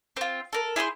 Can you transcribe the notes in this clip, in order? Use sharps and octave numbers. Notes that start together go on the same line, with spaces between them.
C4 F4
A4 A#4
E4 G#4 A4 C5